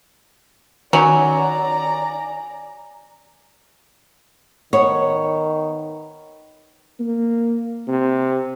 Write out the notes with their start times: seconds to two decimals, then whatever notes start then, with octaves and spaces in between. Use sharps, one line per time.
0.93 D#3 F#3 C#4 D#4 D5 G#5 A#5
4.73 D#3 B3 C#5
6.99 A#3
7.87 C3